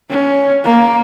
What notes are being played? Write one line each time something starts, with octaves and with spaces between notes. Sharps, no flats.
C#4
A#3